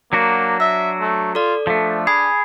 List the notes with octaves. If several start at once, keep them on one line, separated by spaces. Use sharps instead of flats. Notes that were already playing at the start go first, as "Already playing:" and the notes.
F#3 A#3 D4 F#4
E5 E6
A3
F4 A4 D5
F3 A3 D4
G#4 G#5 B5